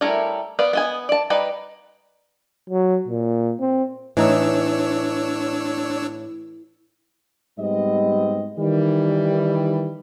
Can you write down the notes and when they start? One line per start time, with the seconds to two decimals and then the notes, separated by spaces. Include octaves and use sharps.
0.01 G3 A3 E4 A#4 C#5
0.59 B3 B4 D5 F5
0.73 B3 D#5 G#5
1.09 D5 A5
1.30 G3 D#4 B4 D5
2.70 F#3
3.08 A#2
3.60 C4
4.17 A2 E3 D4 D#4 C#5 E6
7.58 G#2 G3 B3 C4 D#5
8.57 D#3 E3 G3